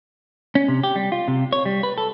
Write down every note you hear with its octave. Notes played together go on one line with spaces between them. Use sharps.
C#4
C3
G4
G3
F4
C3
C#5
G3
B4
A4